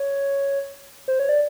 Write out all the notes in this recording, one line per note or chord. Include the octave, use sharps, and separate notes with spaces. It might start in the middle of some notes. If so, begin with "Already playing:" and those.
Already playing: C#5
C5
C#5
D5